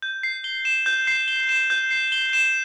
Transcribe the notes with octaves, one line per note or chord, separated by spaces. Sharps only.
G6
C7
G7
E7
G6
C7
G7
E7
G6
C7
G7
E7